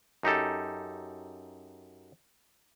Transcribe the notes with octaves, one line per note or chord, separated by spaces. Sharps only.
F#2 D#4 G4 A4